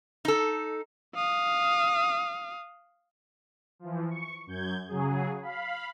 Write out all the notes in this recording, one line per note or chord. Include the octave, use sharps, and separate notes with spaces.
D#4 A4
F5 D#6
E3 F3
C#6
F#2 G6 G#6
C#3 F#3 G#4
F5 B5